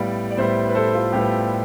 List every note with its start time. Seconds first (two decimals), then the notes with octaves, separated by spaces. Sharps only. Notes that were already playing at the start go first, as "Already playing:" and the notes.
Already playing: A2 G3 B3 D5 F5
0.31 D5
0.37 A2 G3 B3 C5 E5
0.68 B4
0.75 A4 C5
0.94 F4 A4
1.12 A2 G3 B3 G4